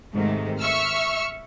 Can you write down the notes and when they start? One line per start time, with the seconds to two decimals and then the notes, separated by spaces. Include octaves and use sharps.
0.12 G#2 C3 D#3 A3
0.59 E5 C#6 E6 F6